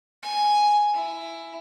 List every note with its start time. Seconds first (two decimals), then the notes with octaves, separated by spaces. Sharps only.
0.23 G#5
0.94 E4